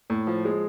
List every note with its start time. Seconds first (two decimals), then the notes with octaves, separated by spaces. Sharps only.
0.10 A2
0.27 F3
0.45 G#3